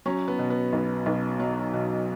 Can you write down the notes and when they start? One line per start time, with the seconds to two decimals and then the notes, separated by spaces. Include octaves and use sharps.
0.06 F#3 C#4
0.28 B3
0.39 B2
0.50 B3
0.73 B1
1.06 B1
1.40 F#3
1.73 B2